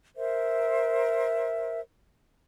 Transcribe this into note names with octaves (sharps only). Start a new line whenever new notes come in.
A#4 C5 E5